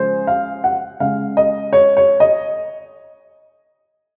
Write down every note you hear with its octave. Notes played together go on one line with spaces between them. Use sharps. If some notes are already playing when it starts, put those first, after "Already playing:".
Already playing: C#3 F3 G#3 C5
F5
F#5
C#3 G#3 F5
D#5
C#5
C#5
D#5